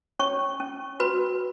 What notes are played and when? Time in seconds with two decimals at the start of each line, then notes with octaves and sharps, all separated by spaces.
0.19 C#4 C#5 C#6
0.60 C#4
1.00 F#4 B4 B5